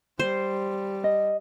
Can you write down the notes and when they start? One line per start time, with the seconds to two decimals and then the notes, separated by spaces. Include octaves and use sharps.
0.19 G3 C5
1.04 D#5